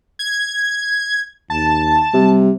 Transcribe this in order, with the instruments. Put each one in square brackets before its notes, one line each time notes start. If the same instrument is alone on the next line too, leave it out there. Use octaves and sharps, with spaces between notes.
[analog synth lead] G#6
[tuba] D#2 [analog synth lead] A5
[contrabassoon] C3 [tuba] G3